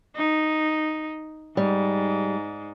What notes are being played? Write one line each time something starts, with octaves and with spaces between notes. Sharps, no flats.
D#4
G#2 G3